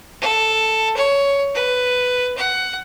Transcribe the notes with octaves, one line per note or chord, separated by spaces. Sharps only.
A4
C#5
B4
F#5